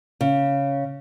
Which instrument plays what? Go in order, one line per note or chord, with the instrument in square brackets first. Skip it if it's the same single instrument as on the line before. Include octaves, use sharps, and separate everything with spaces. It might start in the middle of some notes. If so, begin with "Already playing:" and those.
[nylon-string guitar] C#3